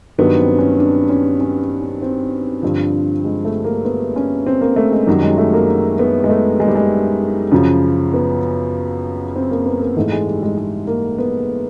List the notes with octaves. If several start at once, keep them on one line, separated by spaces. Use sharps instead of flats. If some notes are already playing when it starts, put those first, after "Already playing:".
G2 D#3 F#3 B3
C4
C#4
D4
C#4
C#4
C#4
C4
G2 D3 F3
G#3
A3
A#3
B3
C#4
C4
A#3
A3
G#3
F#2 D#3 F#3 G3
G#3
A3
A#3
B3
G#3
A3
G#3
G3
G#3
F#2 C#3 F3
B3
C4
A#3
B3
A#3
G#2 E3 A3
G#3
G3
G#3
G#3
A#3
B3